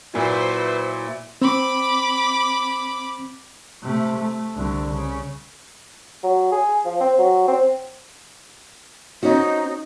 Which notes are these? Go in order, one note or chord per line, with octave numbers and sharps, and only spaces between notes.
A#2 F#3 E4 B4 C5
C4 B5 D6
C3 A3
A3
C2 D3
C#3
F#3
G#4
F3
C4
F#3
C4
C4 C#4 D#4 F#4